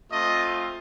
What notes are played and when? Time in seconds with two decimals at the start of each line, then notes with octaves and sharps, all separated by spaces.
0.11 A3 C4 F4 D#5